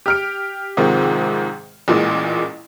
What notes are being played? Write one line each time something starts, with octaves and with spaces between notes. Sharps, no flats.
G4 F6 D7
G#2 C3 D#3 F3
A1 A#2 E3 G#3